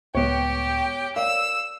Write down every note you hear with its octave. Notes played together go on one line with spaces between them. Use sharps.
C#2 A2 G#3 B3 G4 C#5 G5
A#4 C#5 D5 F5 E6